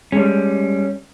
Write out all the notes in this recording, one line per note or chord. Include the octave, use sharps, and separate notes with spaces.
G3 G#3 C#4 A4